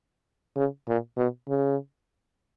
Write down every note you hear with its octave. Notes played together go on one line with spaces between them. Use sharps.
C#3
A#2
B2
C#3